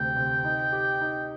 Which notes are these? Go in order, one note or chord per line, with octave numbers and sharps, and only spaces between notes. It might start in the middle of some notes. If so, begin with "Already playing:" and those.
Already playing: D2 C3 G5
C3
D#4
G4
D#4